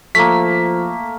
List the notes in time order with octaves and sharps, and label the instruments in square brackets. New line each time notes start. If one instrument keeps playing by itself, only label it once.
[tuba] F3 [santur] A3 A#3 [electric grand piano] B6